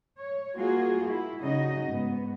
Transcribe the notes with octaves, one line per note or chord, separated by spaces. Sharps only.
C#5
G3 A#3 F4 F#4 G#4
E4
C#3 G3 D#4 F#4 D#5
G#2 B3